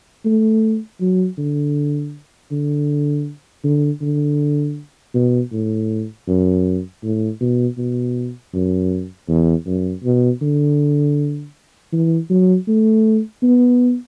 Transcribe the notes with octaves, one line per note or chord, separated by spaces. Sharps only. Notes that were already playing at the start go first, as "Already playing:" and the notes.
A3
F#3
D3
D3
D3
D3
B2
A2
F#2
A2
B2
B2
F#2
E2
F#2
B2
D3
E3
F#3
A3
B3